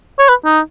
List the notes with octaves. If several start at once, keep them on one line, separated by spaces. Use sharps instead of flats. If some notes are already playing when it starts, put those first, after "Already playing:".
C#5
B4
D#4